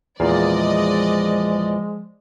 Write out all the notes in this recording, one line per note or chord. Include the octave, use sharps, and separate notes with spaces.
E2 A#2 F3 G#3 D5 D#5 F5